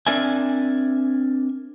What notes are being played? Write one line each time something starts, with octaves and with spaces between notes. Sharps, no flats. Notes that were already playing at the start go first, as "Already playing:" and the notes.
C4 D4 A#4 D5 E5 G#5